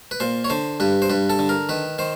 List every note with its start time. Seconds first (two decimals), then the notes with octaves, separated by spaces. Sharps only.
0.11 B4
0.20 A#2 C5
0.44 C#5
0.50 D3 C5
0.80 G2 B4
1.02 C5
1.10 G2 B4
1.30 A4
1.39 D3
1.49 A#4
1.69 D#3 B4
1.99 D#3 C5